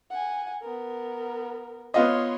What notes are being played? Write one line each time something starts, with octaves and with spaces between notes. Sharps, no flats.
F#5 G#5
B3 A#4
B3 F4 C#5 D#5 C6